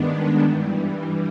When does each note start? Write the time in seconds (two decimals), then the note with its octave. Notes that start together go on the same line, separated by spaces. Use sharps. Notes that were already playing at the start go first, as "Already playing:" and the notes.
Already playing: G2 D#3 G#3 B3 D4
0.40 G2 E3 G3